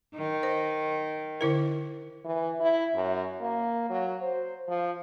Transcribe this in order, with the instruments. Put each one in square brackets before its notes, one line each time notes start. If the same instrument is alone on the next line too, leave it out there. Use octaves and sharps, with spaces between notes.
[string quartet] D#3
[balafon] C5
D3 E4 A#4
[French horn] E3
E4
F#2
A#3
F#3
C5
F3